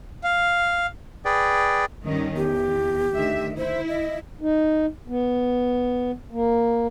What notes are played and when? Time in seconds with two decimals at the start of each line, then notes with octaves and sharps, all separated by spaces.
0.24 F5
1.25 G#4 B4 D5 G5
2.06 G2 D#3 C#4
2.36 E2 G4
3.14 D2 D#3 E5
3.58 E4 C5
3.89 D#5
4.41 D#4
5.08 B3
6.31 A#3